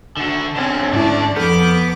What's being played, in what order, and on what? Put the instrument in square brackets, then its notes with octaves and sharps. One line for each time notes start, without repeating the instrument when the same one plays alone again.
[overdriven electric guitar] D3 F#4
[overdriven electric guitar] D3 C#4 [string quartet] C4
[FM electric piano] G#2 C#4 E4 [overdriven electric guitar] A3 D5 [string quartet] D4
[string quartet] F2 D6 [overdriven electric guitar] B3 [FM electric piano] A4 F6 G6